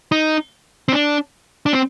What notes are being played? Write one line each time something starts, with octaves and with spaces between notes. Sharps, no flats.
D#4
C4
D4
D4
C4